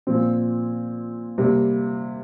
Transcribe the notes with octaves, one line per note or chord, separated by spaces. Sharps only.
A#2 F3 C4
C3 G3 A#3